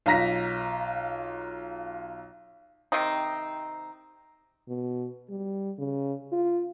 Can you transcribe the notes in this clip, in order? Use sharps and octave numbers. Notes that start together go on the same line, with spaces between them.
B1 F4 A#5 A#6 B6
C3 D#3 C4 D#4
B2
G3
C#3
F4